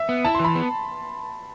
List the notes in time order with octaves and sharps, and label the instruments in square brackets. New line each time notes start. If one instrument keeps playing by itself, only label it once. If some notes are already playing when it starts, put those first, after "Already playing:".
Already playing: [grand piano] E5
[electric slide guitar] B3
[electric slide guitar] E4 [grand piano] A5
[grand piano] C6
[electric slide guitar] E3
[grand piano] B5
[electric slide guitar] B3